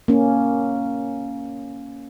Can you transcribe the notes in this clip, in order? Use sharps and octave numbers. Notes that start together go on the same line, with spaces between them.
A#3 C#4